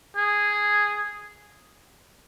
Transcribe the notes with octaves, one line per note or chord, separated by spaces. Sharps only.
G#4